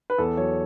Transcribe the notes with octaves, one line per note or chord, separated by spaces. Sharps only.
B4
E2 A4
F#3 C#5